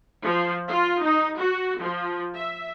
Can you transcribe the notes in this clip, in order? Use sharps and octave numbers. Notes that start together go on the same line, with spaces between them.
F3
F4
D#4
F#4
F3
E5